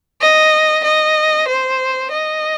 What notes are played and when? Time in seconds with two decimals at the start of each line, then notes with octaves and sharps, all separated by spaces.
0.21 D#5
0.84 D#5
1.48 C5
2.11 D#5